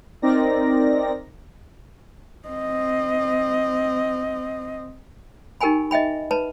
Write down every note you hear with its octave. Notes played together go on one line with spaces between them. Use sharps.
C4 D#4 A#4 D5 A#6
C4 D#5
D#4 G4 A#4 G5 G#5 B5
D#5 E5 G5 B5
B4 A5 B5